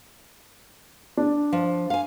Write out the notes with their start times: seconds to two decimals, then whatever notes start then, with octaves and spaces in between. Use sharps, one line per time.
1.17 D4
1.52 F3
1.90 F5 G#5